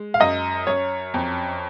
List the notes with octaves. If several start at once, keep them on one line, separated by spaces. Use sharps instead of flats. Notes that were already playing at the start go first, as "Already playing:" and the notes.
Already playing: G#3
F5
F#2 D#5
F#2 C#5
F2